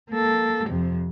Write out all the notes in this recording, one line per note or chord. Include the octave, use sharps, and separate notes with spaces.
A#3 A4
F2 C3